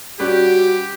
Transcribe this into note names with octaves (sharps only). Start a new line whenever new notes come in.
G3 C#4 F#4 G4 F#6